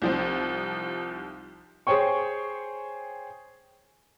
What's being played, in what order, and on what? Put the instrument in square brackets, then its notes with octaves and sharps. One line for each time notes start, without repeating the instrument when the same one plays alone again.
[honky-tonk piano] C2 F3 C4 [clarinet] D#4
[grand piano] G#4 C5 C#5 G5 C#6